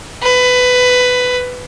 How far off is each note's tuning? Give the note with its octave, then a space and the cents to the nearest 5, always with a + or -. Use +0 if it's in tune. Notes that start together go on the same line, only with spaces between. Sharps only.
B4 +15